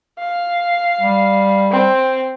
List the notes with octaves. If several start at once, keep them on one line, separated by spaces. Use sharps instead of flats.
F5
G3
C4